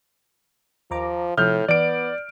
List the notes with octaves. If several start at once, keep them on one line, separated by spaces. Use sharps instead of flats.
D#2 F3 A#5 D6
A2 C3 F3 F6 G6
E3 B3 D5 D7